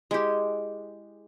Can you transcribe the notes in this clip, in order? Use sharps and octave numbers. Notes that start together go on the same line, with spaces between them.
G#3 E4 G4